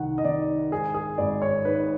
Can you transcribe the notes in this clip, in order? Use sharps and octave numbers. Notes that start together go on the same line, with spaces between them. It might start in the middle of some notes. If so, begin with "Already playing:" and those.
Already playing: C2 D#3 F#5
D#5
D#3 D5
G#2 G#4
G#4
G#1 D5
C#5
G#2 B4